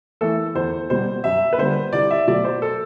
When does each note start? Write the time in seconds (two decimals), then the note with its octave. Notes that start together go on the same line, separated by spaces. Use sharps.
0.21 E3 A3 A4
0.55 E2 C5
0.90 B2 G3 C5
1.24 F#2 E5
1.53 B4
1.58 D3 G3 C5
1.93 C2 D5
2.11 E5
2.27 B2 F#3 A3 D5
2.44 C5
2.62 A4